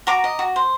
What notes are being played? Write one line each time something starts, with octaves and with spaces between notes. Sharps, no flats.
F#4 A#5 D6
D#5
F#4
C5